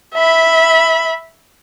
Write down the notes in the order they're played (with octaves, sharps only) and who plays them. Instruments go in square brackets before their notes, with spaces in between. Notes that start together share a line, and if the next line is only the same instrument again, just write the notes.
[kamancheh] E5 B5